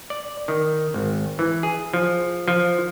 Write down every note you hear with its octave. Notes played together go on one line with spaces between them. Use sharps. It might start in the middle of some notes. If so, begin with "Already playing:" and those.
D5
D#3
G#1
E3
G#4
F3
F3